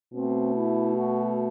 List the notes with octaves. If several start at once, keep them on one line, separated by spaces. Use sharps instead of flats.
B2 A3 C4
E4
F#4